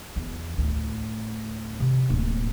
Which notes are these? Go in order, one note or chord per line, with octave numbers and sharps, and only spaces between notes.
E2
D2 A2
C3
D1 A#3